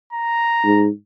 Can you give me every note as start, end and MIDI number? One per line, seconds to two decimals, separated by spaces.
0.13 0.86 82
0.65 0.89 44